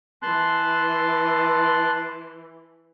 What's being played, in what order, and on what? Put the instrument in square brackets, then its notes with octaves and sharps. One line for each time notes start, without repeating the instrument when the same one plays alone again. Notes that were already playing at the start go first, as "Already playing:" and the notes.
[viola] E3 [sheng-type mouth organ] A5 C6 F#6